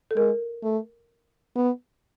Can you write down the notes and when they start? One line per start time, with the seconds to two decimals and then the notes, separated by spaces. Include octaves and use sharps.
0.11 A4
0.16 G#3 A#4
0.64 A3
1.56 B3